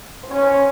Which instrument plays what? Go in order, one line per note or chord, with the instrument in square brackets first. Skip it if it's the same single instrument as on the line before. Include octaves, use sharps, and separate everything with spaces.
[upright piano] C5
[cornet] C#4 [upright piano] C#5
[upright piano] C5
C#5